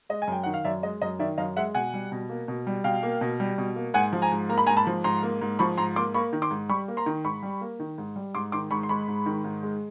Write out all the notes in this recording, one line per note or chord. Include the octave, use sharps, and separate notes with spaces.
G#3 D#5
G#5
F#2 G5
D#3 F#5
F5
F#2 D5 E5
G#3 D#5
F#2 D#5
D#3 D5 E5
F#2 D#5 F5
G#3 E5 F#5
B2 F#5 G#5
G3
B2
A#3
B2
G3
B2 F5 G5
A#3
B2
G3
B2
A#3
G#2 F#5 G#5
F3
G#5 A#5
G#2
A#3 A#5
B5
G#2 G#5 A#5
A5 B5
F3
G#2 A#5 C6
A#3
G#2
F3 B5 C#6
G#2 A#5 C6
A#3 C6 D6
A#3 B5 C#6
D#3
C6 D6
G#2
G3 B5 C#6
A#3
A#5 C6
D#3
G#2 B5 C#6
G3
A#3
D#3
G#2
G3
G#2 C6 D6
D#3 C6 D6
G#2 B5 C#6
C6
G#3 B5 C#6
G#2
D#3
G#2
G#3